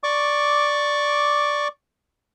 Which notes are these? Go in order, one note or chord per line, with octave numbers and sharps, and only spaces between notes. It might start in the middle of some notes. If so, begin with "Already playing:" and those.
D5 C#6 D6